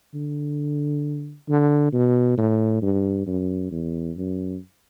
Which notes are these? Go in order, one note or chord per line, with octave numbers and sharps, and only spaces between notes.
D3
D3
B2
A2
G2
F#2
E2
F#2